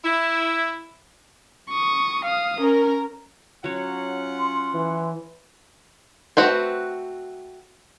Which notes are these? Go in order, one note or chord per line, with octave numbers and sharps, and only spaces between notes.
E4
C#6 D#6
F5 D#6
C#4 A#4
F#3 C#4 F4 C#5 F#5
C6
E3
A3 C4 F#4 B4 C5